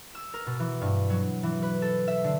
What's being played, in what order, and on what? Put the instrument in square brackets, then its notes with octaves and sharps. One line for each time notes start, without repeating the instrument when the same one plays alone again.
[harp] E6
A#4
B2
E3
G2
F#3
E3
B4
A4
E5
D3